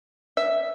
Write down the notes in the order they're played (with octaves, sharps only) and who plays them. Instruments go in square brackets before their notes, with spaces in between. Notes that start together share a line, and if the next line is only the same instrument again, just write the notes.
[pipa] E5